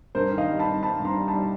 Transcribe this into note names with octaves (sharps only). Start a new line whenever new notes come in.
G2 A#4 C5
D#3
D#5 F5
G3
A5 B5
G2
G2 A5 B5
G2
A#5 C6
G3
A5 B5
G3